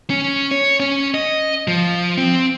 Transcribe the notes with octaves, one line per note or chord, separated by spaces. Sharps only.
C#4
C#5
C#4
D#5
F3
C4